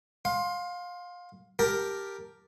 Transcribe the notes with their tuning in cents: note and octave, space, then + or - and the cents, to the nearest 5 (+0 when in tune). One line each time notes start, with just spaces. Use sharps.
F5 +25 C6 +10
G4 +0 A#4 +0 A5 +5